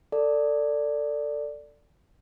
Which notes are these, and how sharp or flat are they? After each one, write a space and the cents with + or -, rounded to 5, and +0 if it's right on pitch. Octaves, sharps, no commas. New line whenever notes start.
A4 +25 D5 +0